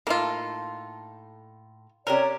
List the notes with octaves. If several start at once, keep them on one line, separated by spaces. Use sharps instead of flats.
A2 A#3 D#4 F4 A4
C3 C#4 G4 A#4 C#5 D5